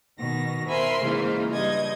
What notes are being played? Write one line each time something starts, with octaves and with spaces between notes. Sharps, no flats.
B2 D#3 A#6
A#4 C5 E5 G#5 B5 C6
G#2 C#3 E3 A#3 F4
G2 D#5 G#6